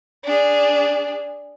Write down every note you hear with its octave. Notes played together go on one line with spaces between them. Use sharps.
D4 G#4